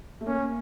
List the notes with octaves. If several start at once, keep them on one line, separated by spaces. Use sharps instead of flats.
A3
A#3 C#4